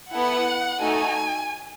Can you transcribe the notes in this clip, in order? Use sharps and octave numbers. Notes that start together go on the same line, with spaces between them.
B3 E4 A4 F#5
A3 D#4 F#4 A4 G#5